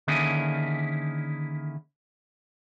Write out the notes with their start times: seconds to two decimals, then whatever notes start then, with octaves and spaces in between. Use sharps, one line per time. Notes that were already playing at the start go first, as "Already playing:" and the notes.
0.08 D3 D#3 A#3 C#4 E4 G#4